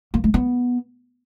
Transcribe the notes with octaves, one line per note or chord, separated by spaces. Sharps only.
A#3
A3
B3